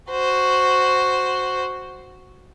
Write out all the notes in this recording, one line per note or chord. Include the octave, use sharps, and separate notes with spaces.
F#4 C5